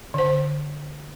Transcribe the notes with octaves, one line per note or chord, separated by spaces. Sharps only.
D3 C5